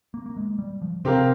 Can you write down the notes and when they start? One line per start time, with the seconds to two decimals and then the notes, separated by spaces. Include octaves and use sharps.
0.14 A#3
0.26 A#3
0.36 G#3
0.59 G3
0.82 F3
1.05 C3 C4 G4 A#4 F5